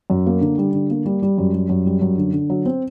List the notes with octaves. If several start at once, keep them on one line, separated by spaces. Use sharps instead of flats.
F#2
A#3
D3
G3
D3
A#3
G3
G3
F#2
G3
F#2
G3
F#2
D3
D3
F#3
C4